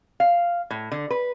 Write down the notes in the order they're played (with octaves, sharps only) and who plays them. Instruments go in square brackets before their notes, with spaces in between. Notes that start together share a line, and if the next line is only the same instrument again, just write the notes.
[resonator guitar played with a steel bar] F5
A2
D3
B4